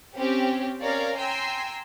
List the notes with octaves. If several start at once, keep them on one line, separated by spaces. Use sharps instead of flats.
C4 C#4 G4
C#4 A#4 C#5 D5 F5 A#5
G5 G#5 A#5 C6 E6